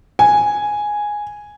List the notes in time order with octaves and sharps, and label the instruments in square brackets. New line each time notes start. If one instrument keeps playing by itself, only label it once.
[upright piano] G#5